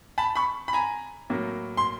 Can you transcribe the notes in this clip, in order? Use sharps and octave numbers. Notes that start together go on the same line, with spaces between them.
A5 B5
B5 C#6
B5
G#5 A#5
A2 F#3 A#3
C6